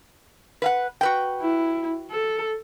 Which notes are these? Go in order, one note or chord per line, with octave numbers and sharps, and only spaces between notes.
B4 F5 F#5
F#4 B4 G5
E4
A4